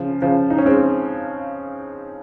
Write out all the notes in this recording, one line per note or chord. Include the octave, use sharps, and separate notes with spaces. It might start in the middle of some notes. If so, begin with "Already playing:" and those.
Already playing: C#3 F3
C#3 F3
D#4
C#4
G#3 C4